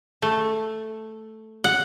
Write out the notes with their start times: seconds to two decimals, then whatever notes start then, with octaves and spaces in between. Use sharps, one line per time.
0.22 A3
1.64 F#5